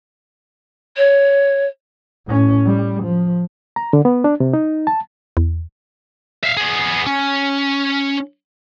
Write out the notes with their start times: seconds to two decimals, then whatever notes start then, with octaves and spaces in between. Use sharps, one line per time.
0.97 C#5
2.26 A2 C#4
2.66 G3
3.03 F3
3.76 A#5
3.93 D3
4.05 B3
4.24 D4
4.40 C3
4.53 D#4
4.87 A5
5.37 E2
6.44 E5 F5
6.57 B3 G#4
7.07 C#4